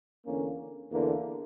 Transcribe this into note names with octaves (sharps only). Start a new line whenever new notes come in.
E2 D3 A#3 C#4
E2 D3 A#3